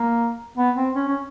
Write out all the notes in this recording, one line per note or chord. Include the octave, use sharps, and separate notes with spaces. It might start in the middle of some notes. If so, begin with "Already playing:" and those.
Already playing: A#3
B3
C4
C#4
C#4